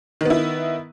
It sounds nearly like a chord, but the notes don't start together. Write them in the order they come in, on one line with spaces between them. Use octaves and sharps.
D#3 B3 E4